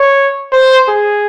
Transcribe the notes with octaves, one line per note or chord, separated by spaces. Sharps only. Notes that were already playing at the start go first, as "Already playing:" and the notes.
Already playing: C#5
C5
G#4